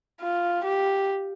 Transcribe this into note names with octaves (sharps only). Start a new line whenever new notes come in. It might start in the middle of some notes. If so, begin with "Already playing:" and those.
F4
G4